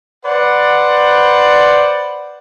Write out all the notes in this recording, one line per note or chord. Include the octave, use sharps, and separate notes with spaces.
B4 C5 D5 F#5